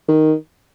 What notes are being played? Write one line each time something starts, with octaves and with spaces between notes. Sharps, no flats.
D#3